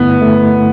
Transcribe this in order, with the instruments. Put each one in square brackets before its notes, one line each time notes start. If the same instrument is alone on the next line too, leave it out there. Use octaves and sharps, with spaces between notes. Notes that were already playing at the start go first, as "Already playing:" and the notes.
Already playing: [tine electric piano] G2 D3 A3 E4 [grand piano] B3
[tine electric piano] A3